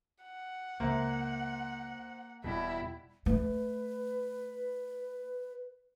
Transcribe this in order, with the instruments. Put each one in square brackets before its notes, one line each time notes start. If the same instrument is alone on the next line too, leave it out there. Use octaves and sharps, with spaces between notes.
[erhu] F#5
[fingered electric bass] C#2 [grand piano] A#3 [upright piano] C5 E5
[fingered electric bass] E1 B3 [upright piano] B2 G3 [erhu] E4
[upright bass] A3 [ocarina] B4